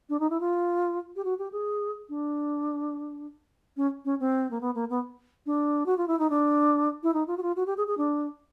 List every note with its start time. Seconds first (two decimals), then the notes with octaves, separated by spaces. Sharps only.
0.09 D4
0.20 D#4
0.30 E4
0.40 F4
1.16 G4
1.25 F#4
1.39 G4
1.52 G#4
2.09 D4
3.77 C#4
4.05 C#4
4.20 C4
4.51 A#3
4.61 B3
4.75 A#3
4.90 B3
5.46 D4
5.86 F#4
5.98 F4
6.08 E4
6.19 D#4
6.30 D4
7.03 E4
7.14 D#4
7.27 F4
7.37 F#4
7.43 F4
7.56 F#4
7.66 G4
7.77 G#4
7.87 G#4
7.97 D4